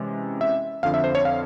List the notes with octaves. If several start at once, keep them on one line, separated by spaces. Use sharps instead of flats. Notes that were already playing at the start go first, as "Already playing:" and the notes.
Already playing: C3 E3 G#3 C#4
E5
F2 D3 F3 F5
E5
C5
C#5
F5